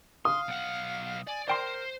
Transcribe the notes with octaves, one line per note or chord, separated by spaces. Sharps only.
F5 C6 D#6
B1 F#5
D5 G#5
A#4 C5 D5 G5 C6